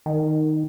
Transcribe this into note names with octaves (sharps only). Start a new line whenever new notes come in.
D#3